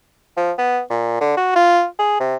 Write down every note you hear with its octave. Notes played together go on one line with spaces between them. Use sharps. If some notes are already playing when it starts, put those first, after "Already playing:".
F3
B3
A#2
D3
F#4
F4
G#4
C3